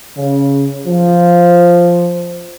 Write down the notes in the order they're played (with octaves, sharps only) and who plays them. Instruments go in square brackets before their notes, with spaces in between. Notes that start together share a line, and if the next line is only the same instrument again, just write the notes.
[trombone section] C#3
F3